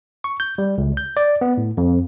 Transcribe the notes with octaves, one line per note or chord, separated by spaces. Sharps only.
C#6
G6
G3
C#2
G6
D5
B3
A2
F2